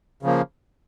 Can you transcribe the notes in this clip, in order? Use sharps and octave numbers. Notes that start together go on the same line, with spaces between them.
C#3 F3 A#3